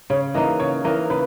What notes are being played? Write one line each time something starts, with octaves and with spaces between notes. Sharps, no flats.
C#3 C#5
E3 A#3 D#4 D#5
C#3 C#5
E3 A#3 D#4 A#4
C#3 B4